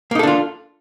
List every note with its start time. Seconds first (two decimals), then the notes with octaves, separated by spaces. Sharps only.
0.11 A#3
0.15 D#4
0.19 A4
0.23 D4
0.27 F4